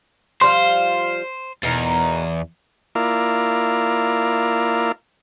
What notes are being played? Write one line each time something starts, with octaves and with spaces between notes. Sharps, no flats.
F3 G3 F4 C5 C6
E2 B2 D#4 A#4
A#3 E4 F4 A#4 D5 F5